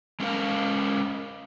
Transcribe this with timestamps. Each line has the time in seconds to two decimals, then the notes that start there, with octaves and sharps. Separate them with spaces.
0.20 G#3 C#4 A#4 F5